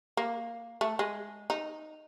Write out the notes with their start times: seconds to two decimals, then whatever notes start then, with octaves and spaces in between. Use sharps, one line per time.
0.17 A#3
0.81 A3
0.99 G#3
1.50 D#4